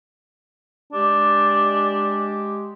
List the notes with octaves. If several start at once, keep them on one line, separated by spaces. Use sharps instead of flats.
G#3 D4 G4